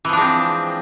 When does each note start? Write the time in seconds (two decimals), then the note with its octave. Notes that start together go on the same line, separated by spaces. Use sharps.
0.05 E3
0.09 F3
0.13 D4
0.17 G#3
0.21 C4